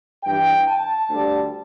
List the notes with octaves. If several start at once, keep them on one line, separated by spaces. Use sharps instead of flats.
G2 E3 G3 G5
A5
D2 D3 G3